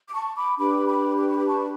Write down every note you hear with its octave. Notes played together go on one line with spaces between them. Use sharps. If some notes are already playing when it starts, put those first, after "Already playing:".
D6
A5 C#6
B5 D6
D4 G4 B4 B5 D6
B5 D6
D6
C#6
B5 D6
A5 C#6